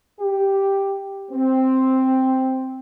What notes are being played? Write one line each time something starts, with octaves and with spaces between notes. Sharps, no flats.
G4
C4